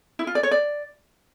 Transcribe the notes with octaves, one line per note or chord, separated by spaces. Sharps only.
E4
F4
D5
C#5
D5